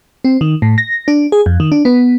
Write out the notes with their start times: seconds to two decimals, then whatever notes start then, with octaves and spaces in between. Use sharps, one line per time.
0.25 C4
0.41 D#3
0.62 A2
0.78 A#6
1.08 D4
1.32 G#4
1.46 F2
1.60 D#3
1.72 D4
1.85 B3